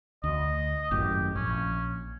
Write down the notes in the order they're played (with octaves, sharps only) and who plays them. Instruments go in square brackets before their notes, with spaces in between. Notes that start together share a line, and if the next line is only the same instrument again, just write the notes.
[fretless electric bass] D2 [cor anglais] D#5
[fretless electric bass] G#1 F#2 A2 [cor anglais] G4
[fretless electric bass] A#1 [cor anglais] C#4